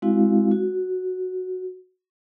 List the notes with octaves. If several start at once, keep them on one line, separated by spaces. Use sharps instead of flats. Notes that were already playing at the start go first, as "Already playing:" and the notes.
G#3 C4 E4 F#4 F5
F#4